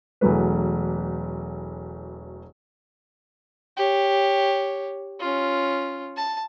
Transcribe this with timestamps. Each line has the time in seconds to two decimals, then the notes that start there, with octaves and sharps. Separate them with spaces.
0.21 E1 E3 F#3 A3 B4
3.77 G4 C#5
5.20 C#4 F4
6.17 A5